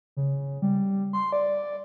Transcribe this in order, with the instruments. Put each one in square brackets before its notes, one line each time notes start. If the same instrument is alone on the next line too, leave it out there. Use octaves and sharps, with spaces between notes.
[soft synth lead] C#3
G3
C6
D5